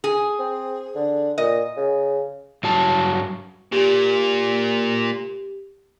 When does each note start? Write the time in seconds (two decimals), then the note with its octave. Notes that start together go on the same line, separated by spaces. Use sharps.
0.04 G#4
0.39 C4
0.95 D3
1.38 A#2 D#5
1.77 C#3
2.63 G2 F#3 A5
3.72 A#2 G4